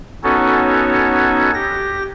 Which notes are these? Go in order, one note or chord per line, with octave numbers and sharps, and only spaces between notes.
B3 C#4 D#4 F#4 A4 C#5
G4 A#6